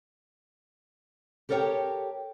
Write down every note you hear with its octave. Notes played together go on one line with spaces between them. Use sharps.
G4 A4 A#4 C#5 E5 G5